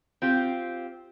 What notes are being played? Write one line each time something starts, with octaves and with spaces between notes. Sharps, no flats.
C4 F4 G4